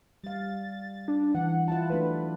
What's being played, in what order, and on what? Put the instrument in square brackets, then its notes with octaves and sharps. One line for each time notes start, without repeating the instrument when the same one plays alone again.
[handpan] G3 F5 [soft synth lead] A6
[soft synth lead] D4
[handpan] E3 [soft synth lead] F#5
[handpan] E4 F4 F#5 [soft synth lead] A5
[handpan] F#3 A3 D4 [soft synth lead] B4